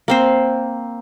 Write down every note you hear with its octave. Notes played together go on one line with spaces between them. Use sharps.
A#3 C4 C5